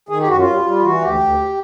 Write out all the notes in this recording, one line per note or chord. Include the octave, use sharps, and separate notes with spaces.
D#3 G#4
G4
F#2 F#4
F4
G3
G3
G4
E3 F#4
D2 G4
D2